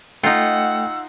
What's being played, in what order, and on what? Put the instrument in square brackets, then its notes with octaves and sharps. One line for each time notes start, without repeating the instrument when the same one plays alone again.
[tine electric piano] A3 G5 C#7 [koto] D#4 F4 [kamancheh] F#5 [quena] E6